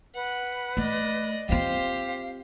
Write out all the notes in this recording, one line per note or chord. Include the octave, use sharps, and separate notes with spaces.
B4 F#5
A3 D5 D#5
C4 F4 G4 C5 F5